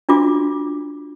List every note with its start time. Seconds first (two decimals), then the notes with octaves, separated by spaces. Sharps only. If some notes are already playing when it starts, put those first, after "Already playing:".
0.09 D4 F4 F#4 D6